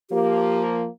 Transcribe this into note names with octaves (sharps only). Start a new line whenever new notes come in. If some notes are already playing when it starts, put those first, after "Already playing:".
F3 A#3 G4